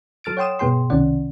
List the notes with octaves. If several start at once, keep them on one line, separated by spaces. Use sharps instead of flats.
F#3 A4 F6 A6 D7
C#5 F#5 G5 C6 D#6 E7
G2 B2 B3 G#4 G5 C6
C2 C3 D#3 C#4 D5 F#5